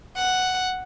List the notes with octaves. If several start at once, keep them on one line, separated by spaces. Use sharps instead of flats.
F#5